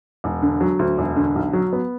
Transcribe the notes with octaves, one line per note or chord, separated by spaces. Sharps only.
E1
D3
F#3
D2
E1
D3
B1
F#3
B3